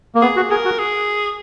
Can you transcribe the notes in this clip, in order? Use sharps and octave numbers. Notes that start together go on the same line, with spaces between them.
A#3
B3 G#4
F#4
G#4 A#4
F#4
G#4